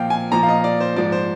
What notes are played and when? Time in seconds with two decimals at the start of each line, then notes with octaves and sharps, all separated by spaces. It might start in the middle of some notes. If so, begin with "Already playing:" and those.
Already playing: A#2 F3 F5 G5
0.10 G#5
0.32 A#2 F3 A#5
0.43 F5
0.48 D#5
0.64 D5
0.80 C5
0.96 G#2 F3 D5
1.12 C5